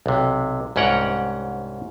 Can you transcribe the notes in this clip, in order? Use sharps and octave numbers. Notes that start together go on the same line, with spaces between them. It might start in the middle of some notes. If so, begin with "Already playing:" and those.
B1 C3
C2 G#2 C#4 F#5 G5 A#5